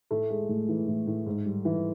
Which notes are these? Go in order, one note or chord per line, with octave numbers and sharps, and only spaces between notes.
A2 A3
G#3
A2
E3
A2
A2
G#2
G3
E3